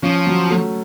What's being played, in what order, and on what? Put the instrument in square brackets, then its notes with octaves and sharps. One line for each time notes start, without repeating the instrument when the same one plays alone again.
[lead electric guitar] F3 [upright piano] C#4
[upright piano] F#3
A3